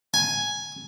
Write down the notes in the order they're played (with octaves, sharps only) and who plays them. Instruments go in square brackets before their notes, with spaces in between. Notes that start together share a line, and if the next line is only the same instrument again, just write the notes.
[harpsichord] G#5